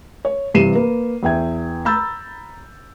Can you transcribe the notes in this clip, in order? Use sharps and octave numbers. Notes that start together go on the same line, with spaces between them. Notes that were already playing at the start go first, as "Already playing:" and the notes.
C#5
G2 C3 E3 C7 D#7 E7
A#3 A#4 B4
E2 E5 G5 G#6
A#5 B5 E6 G6 A6